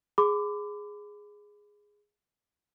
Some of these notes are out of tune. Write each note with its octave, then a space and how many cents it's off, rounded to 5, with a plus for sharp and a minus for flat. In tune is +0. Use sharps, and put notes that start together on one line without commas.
G#4 +0 B5 +40 D6 +0